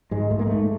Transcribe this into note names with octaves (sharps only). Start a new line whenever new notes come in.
G#2 G#3
G#2 A3
A#3
G#2 A3